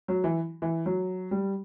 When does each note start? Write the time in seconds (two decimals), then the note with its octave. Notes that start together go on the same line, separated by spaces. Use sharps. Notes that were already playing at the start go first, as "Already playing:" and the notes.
0.08 F#3
0.24 E3
0.62 E3
0.86 F#3
1.31 G3